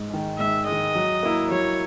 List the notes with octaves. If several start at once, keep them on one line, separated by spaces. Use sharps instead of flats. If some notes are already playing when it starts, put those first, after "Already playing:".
Already playing: G#2
D#3 G#3
G#2 E5
G#3 D#5
D#3
F#3
A#3 E4
F#3 C#5